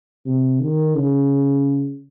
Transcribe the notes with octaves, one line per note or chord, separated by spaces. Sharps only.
C3
D#3
C#3